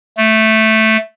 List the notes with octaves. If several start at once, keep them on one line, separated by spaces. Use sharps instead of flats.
A3